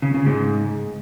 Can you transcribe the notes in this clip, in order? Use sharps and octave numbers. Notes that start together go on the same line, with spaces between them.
C#3
C#3
G#2